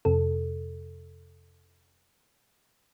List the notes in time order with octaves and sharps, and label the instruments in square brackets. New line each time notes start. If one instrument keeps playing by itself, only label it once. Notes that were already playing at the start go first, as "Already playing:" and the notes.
[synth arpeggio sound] F2 C3 A4